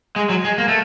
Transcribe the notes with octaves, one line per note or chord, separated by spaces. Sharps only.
G#3
F#3
G#3
A#3
A3